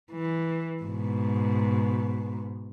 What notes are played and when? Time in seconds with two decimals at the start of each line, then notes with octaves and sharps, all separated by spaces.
0.12 E3
0.83 G#2 B2